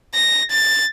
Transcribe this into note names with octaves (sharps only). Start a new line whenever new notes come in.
A#6
A6